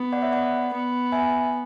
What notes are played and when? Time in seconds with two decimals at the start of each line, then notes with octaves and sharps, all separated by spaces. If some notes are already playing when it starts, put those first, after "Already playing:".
Already playing: B3
0.12 D5 F#5
0.22 C#5 E5
0.32 D5 F#5
0.73 B3
1.12 E5 G#5